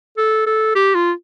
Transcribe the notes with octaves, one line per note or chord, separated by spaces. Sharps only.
A4
A4
G4
F4